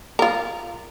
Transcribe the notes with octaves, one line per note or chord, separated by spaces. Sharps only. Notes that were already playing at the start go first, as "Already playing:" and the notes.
F4 A#4